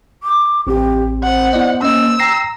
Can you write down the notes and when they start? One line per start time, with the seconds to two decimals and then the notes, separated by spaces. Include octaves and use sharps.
0.23 D6
0.67 A1 C4 G4
1.23 C5 F#5
1.53 B3 E4 D5 D#5
1.82 A#3 C#4 D#5 E6
2.20 G5 A#5 A#6 C7